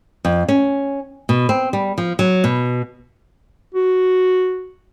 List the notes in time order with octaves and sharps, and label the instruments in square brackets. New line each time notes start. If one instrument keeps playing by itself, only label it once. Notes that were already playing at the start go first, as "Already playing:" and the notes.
[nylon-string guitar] F2
C#4
B2
C4
G3
F3
F#3
B2
[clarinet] F#4